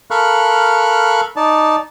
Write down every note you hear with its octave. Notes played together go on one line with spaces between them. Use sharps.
A4 A#4 F5 B5 C#6 F#6
D#4 D5 A5